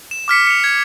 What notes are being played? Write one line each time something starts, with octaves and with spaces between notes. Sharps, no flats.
E7
D6 F6 B6 C#7
C#7 F7
G#6